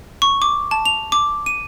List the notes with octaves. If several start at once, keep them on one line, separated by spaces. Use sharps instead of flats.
C#6
D6
A5
F7
D6
D#7